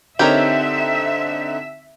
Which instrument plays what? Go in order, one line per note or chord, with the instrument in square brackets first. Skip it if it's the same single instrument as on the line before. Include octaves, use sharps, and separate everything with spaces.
[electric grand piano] D3 C4 D#4 [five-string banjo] G4 A#4 C#5 [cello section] E5